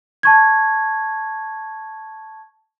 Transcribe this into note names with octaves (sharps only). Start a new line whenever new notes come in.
A5 C#6 G#6